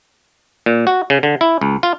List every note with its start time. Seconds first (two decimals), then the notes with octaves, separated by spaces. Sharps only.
0.66 A#2
0.87 F#4
1.10 C#3
1.23 D3
1.41 E4
1.61 C#2
1.83 F4